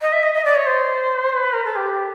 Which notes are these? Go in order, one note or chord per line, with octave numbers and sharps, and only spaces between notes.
D#5
E5
D#5
D#5
D5
C#5
C5
B4
A#4
A4
G4